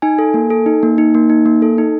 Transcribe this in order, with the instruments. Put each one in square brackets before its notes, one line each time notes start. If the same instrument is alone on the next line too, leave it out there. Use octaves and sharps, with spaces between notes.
[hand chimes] D#4 G#5
A4
A#3
A4
D#4
A#3
D#4
A#3
D#4
A#3
A4
D#4